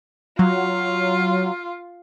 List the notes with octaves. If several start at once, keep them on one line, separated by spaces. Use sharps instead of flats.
F#3 F4